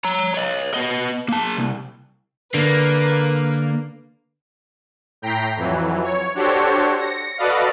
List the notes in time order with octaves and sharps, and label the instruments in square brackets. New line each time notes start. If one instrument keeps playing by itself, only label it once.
[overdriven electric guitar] C#5 A#5
C#5 D#5
B3 D#5
A#3 A5
C2
[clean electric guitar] D3 [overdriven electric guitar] A#3 [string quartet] B4
[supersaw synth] A2 G5 A#5 B6 C7
F2 E3 F#3
C#5
D4 F#4 G4 A4 C5 C#5
A#6 C#7
F#4 A4 B4 D5 D#5 F5